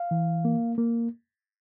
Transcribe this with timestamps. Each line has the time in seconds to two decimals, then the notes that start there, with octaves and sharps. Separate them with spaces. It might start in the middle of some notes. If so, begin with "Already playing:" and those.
Already playing: F5
0.11 E3
0.45 A#3
0.78 A#3